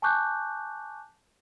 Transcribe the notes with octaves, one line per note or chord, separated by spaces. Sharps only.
G#5 A5 C#6 D6 F#6 G6